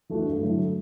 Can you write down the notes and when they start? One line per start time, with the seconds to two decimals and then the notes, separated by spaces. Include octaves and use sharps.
0.09 E3 A3 D4 F#4
0.25 G2
0.42 D3 F#3 A3 E4